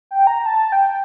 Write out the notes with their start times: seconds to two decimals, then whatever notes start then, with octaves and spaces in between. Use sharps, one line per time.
0.11 G5
0.27 A#5
0.46 A5
0.72 G5